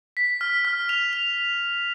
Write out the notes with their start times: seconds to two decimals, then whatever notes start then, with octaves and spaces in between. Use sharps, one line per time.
0.17 B6
0.41 F6
0.65 F6
0.89 F7
1.13 F7